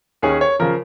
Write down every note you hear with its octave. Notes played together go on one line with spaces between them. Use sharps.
D#2 D#3 C#4 G#4
C#5
C#3 F3 A#4